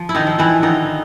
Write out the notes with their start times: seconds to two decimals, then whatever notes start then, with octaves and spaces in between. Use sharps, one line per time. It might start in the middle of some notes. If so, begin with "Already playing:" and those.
Already playing: F3
0.09 E4
0.15 D#3 D#4
0.27 F3
0.39 E3 E4
0.62 D3 D#3 D#4